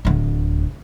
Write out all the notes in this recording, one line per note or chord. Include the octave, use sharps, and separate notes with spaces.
D1 D2